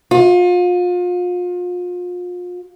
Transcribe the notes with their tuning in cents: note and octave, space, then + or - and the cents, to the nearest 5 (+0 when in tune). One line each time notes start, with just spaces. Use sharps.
F4 +35